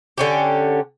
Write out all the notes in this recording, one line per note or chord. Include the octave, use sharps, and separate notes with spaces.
D3 C#4 G4